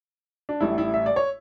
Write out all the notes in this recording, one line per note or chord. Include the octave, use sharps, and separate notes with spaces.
D4
A1 A2 G3 E4
E4
E5
D5
C#5